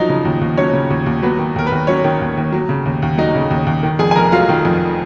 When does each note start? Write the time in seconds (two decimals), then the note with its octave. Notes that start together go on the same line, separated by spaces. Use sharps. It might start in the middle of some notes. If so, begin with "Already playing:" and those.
Already playing: F3 F#3 D#4 D#5
0.09 C#3
0.25 D#2
0.41 D#2
0.58 F#3 C#4 C#5
0.73 C#3
0.90 D#2
1.06 D#2
1.23 F#3 B3 B4
1.39 D#3
1.56 D#2 A#4
1.65 B3 B4
1.72 D#2
1.87 F#3 C#4 C#5
2.04 D#3
2.21 D#2
2.37 D#2
2.52 F#3
2.69 C#3
2.85 D#2
3.02 D#2
3.18 F#3 D#4 D#5
3.35 C#3
3.50 D#2
3.66 D#2
3.83 D#3
3.99 F2 G#4 G#5
4.11 G#5
4.16 F1 A#4 A#5
4.32 F#3 F4 F5
4.49 D#3
4.65 F2